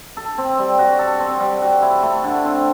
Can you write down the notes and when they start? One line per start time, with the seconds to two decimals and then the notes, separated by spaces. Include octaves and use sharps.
0.17 A4
0.38 C4
0.58 G3
0.79 F#4
0.99 A4
1.20 C4
1.40 G3
1.62 F#4
1.82 E4
2.03 A3
2.24 D3
2.45 C4